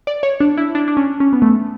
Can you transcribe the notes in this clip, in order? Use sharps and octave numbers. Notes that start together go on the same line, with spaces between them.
D5
C#5
D4
E4
D4
D4
C#4
C#4
B3
A3